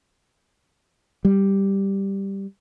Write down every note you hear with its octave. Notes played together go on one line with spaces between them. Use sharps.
G3